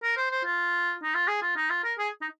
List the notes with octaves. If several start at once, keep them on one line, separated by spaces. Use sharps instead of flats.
A#4
C5
C5
F4
D#4
F4
G#4
F4
D#4
F4
A#4
G#4
D#4